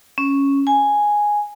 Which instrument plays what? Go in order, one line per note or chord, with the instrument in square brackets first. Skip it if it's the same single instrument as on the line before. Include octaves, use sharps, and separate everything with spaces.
[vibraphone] C#4
G#5